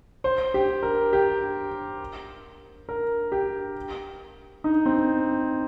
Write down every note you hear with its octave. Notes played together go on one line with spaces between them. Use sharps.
C5
G4
A#4
G4
A#4
G4
D#4
C4